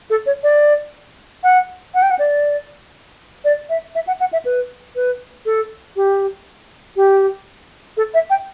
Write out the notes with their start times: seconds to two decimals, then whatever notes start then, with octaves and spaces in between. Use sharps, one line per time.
0.10 A4
0.26 C#5
0.43 D5
1.44 F#5
1.94 F#5
2.03 G5
2.11 F#5
2.19 D5
3.45 D5
3.70 E5
3.95 E5
4.07 F#5
4.20 F#5
4.33 E5
4.45 B4
4.96 B4
5.46 A4
5.96 G4
6.96 G4
7.97 A4
8.14 E5
8.30 G5